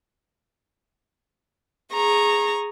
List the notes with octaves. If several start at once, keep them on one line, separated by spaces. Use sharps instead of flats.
G#4 A#5 C#6